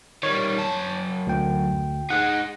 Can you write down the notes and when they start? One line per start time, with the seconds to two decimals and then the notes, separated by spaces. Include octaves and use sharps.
0.23 D#3 G3 C#5
0.58 F#2 A5
1.27 D2 G5
2.10 G#3 D#4 F#5